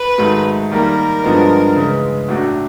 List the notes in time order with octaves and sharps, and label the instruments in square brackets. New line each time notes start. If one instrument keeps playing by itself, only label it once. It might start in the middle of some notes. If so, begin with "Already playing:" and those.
Already playing: [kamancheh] B4
[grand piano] G#2 D#3 F#3 A3
[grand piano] D#3 G3 A#3 [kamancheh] A#4
[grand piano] G2 D3 F3 G#3 B3
C#3 E3 G#3
A2 F#3 A3 D4 F#4